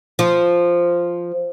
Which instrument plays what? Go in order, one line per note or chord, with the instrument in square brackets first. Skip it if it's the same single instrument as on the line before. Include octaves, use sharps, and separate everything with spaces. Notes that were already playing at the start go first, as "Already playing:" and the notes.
[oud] F3